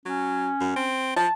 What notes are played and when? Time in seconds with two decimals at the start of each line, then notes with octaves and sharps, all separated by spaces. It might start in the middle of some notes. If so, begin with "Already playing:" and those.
0.06 F#3 C#4
0.60 F#2
0.76 C4
1.16 F3 A5